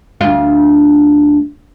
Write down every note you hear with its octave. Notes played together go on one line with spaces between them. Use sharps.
D2 F4